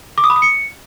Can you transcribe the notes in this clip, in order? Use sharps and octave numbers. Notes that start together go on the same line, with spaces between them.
D6
D#6
B5
D#6
C#7